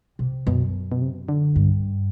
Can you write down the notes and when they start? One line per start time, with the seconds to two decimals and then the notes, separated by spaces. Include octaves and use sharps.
0.19 C3
0.47 F#2 B2
0.92 B2
1.02 C3
1.29 D3
1.56 G2